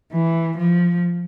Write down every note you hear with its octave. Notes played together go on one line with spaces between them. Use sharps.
E3
F3